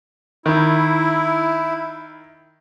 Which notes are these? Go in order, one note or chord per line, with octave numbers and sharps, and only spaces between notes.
D#3 E4